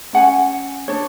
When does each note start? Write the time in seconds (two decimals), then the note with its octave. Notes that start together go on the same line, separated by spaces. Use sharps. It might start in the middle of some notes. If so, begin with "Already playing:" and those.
0.13 C#4 F#5 G#5
0.88 D4 C#5